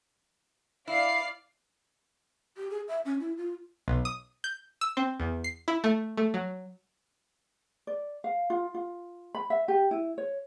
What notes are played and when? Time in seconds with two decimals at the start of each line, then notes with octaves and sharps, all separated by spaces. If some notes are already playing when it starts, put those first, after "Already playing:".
0.88 E4 D5 F5 C7
2.57 G4
2.70 G#4
2.88 E5
3.05 C#4
3.20 E4
3.37 F4
3.88 B1
4.05 D#6
4.44 G6
4.81 E6
4.97 C4
5.20 E2
5.44 C7
5.68 E4
5.84 A3
6.17 A3
6.34 F#3
7.87 D5
8.24 F5
8.50 F4
8.74 F4
9.35 B5
9.50 E5
9.68 G4
9.91 E4
10.18 C#5